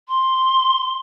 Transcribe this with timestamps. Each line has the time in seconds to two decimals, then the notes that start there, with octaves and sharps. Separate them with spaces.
0.08 C6